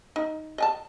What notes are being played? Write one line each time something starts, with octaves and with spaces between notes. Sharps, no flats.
D#4
D#5 G#5 A5